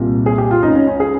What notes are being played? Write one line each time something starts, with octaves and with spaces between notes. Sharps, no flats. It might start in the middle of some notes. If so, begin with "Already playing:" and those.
Already playing: C2 A#2
G#4
G4
F4
C#2 C#3 D#4
C#4
C#4
G#4